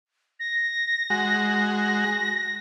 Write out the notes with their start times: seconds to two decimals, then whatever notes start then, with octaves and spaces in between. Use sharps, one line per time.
0.40 A#6
1.10 G#3 F#4
1.52 A#6